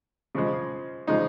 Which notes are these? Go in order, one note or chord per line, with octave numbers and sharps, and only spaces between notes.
C#3 F3 G#3
C#3 F3 G#3 D#4